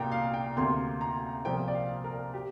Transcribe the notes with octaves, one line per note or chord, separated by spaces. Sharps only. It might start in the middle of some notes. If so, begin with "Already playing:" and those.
Already playing: C2 A#2 A#3 G5 A#5
F5
G5
D2 C3 A#3 C6
A#5
C2 A#2 F3 A#3 G5
D5
F5
A#4
G4